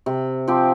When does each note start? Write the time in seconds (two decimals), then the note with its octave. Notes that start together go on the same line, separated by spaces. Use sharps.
0.06 C3
0.47 F3 C4 G4